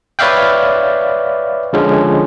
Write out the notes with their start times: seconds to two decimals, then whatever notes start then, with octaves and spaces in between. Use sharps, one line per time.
0.19 B4 C#5 D5 E5 F5 G5
1.73 D3 F3 G#3 C#4